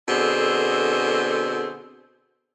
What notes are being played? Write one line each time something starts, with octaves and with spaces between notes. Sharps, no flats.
B2 D3 C4 G#4 A4